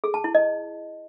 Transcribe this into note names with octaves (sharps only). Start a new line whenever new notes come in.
G#4
A5
E4
D#5